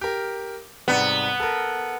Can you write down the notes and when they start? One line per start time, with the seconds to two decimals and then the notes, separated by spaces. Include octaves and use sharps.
0.01 G4 A#4
0.88 G#2 C3 G3 B3
1.40 A4 A#4